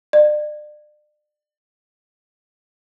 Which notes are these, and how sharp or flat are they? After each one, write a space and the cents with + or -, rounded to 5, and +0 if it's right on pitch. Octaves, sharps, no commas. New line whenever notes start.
D5 +35